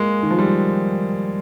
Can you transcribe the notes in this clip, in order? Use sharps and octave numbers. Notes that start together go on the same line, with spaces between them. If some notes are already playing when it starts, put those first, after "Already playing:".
Already playing: G#3 A#3
D#3
F3
G3